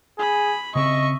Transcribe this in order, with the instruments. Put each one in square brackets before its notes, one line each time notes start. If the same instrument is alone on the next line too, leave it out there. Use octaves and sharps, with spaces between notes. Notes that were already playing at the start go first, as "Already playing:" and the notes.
[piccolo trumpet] G#4 [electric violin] B5
[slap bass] C#3 C4 [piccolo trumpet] D#5 [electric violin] E5 C#6